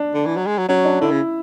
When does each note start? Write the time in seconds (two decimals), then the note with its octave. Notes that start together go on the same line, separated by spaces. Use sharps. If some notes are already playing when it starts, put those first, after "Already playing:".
Already playing: D4
0.14 D3
0.26 E3
0.37 F#3
0.47 G#3
0.58 F#3
0.69 F#3 C#4
0.85 D4
1.01 D3 E4
1.11 C#3